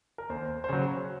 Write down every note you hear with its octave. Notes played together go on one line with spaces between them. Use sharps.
A#4
D#2 C5
C5
C#3 F#3 C#5